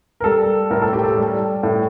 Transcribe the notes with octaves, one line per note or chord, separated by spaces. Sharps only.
A#4
G3 A4
A2 A#4
A4
G4
A4
G3
A2